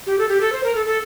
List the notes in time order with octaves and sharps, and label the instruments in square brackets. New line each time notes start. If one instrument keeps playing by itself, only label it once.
[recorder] G4
A4
G4
A4
C5
A#4
A4
A4